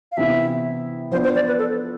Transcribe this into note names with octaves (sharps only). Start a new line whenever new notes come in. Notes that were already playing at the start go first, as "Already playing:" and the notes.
F5
C3 E3 B3 E4 E5
F3 B3 D4 C5
C5
D5
B4
A4